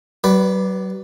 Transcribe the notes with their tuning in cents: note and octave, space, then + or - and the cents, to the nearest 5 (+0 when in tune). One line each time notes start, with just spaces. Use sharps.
F#3 +40 B4 +0 D5 +0